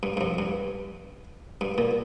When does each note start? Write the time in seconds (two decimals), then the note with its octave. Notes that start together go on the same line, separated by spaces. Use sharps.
0.03 G2
0.17 G2
0.21 F2
0.39 G2
1.61 G2
1.78 A#2